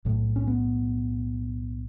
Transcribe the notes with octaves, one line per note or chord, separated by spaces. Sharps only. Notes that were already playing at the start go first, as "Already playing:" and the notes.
B1 A2
C#4
B3